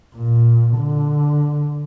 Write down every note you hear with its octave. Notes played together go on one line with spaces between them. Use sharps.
A#2
D3